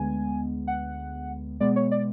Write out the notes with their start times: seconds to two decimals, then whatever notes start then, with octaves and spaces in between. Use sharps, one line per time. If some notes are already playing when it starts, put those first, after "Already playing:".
Already playing: D2 D3 G#3 B3 G#5
0.67 F#5
1.60 B2 G#3 B3 D5
1.76 C#5
1.91 D5